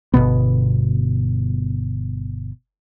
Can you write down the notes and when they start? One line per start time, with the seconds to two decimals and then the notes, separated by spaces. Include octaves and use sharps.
0.14 G1 F#2 B2 B3